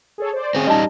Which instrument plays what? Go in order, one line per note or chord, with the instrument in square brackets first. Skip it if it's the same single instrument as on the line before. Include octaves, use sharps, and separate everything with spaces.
[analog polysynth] G#4 A4 C#5
C5 D5
[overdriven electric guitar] C4 G#4 [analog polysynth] C#4
[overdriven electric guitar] G3 D#4 [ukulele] D#5 A5